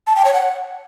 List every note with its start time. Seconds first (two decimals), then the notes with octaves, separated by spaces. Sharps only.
0.07 A5
0.16 G5
0.25 C#5
0.34 F#5